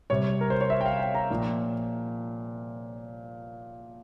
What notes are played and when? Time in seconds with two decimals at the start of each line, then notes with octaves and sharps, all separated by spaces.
0.10 C3 G3 C#5
0.41 A#4
0.50 C5
0.61 C#5
0.70 E5
0.81 G5
0.86 F5
0.99 G5
1.15 A#5
1.30 A#2 F3